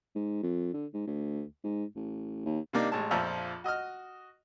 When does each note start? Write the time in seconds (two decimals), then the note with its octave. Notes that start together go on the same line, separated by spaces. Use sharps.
0.15 G#2
0.43 F2
0.73 D3
0.94 G#2
1.07 D2
1.64 G#2
1.95 A1
2.45 D#2
2.73 C3 G3 A#3 D4 D#4
2.92 A1 G#3 A5
3.11 A#1 F2 F3 D5 E5 A#5
3.64 F#4 D#5 D#6 F6